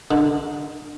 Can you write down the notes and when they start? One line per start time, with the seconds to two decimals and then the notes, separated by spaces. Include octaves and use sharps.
0.11 D3